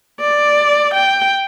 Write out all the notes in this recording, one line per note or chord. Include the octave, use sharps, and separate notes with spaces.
D5
G5